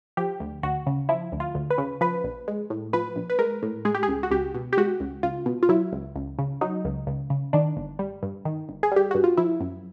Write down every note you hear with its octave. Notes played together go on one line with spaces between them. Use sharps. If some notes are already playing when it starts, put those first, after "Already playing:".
F3 G4
D2
D2 F#4
C#3
F3 E4
D2
F4
D2
B4
C#3
F3 B4
A#1
G#3
A2
F3 B4
A#1
B4
G#3 A#4
A2
G#3 G#4
G4
G#4
C#2
F#4
C#2 G4
B2
G4
G#3 F#4
C#2
C#2 F4
B2
F4
F#3 E4
C#2
C#2
C#3
F#3 D#4
C#2
C#2
C#3
D#3 D4
G1
G3
G2
D#3
G1
G#4
G3 G4
G2 F#4
F4
F3 E4
F#2